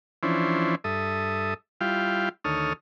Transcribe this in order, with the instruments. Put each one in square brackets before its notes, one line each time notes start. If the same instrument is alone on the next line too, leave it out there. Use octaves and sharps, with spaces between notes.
[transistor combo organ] E3 F3 C#4 D4 E4 C5
G2 A4 E5 D#6
G3 E4 F4 F5 G5
D2 D#3 A4 C#5 D#6 F6